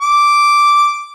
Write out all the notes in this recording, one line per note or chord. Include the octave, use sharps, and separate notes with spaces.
D6